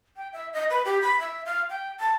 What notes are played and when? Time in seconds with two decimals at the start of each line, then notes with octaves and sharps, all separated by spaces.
0.16 G5
0.33 E5
0.53 D#5
0.70 B4
0.85 G4
1.02 B5
1.20 E5
1.46 F5
1.70 G5
2.00 A5